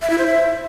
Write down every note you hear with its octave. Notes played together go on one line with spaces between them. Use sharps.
E5
E4
C5
E5